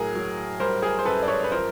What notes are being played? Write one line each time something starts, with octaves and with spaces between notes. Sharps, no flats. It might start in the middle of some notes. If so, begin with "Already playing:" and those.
Already playing: A2 F#3 G#4 A#4
F#3
G3 A#4 C5
G#4 A#4
C5
F#2 A4 B4
D5
B4 C#5
B4
F3 A#4 C5